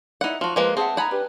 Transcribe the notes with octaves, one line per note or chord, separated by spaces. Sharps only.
D#4 E4 B4 D5 F#5
F3 F4 F#4 A5
F3 G#3 A#3 B4
C4 G#4 E5 F#5 A5
D#4 F#5 G#5 A#5 B5
D4 G4 B4